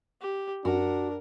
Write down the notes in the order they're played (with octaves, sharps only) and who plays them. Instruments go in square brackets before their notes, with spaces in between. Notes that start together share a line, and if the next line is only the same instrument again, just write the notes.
[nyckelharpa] G4
[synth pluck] F#2 [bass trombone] D4 [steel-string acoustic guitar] F#4 [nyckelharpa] A#4